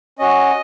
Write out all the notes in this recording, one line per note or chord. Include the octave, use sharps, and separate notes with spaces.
C#4 F#4 D#5